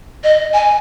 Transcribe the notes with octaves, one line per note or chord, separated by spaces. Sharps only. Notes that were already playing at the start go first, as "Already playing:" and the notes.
D#5
G#5